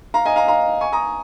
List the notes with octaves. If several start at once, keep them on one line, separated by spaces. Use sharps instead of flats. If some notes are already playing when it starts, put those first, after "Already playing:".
F5 A#5
D#5 G#5
F5 A#5
F5 A#5
G#5 C#6
A#5 D#6